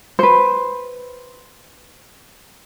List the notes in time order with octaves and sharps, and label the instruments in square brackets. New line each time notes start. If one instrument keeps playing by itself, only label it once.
[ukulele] B4 C5